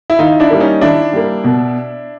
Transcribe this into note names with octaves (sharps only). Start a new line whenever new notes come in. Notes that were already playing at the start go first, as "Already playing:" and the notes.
E4
D#3 D#4 F4
D4 E4
G3 A#3
C#4 D#4
D#3 D4 E4
G3 A#3
B2